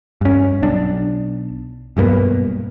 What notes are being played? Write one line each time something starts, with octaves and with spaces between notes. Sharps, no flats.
G2 C#4
B1 D4
B1 G2 A#3 B3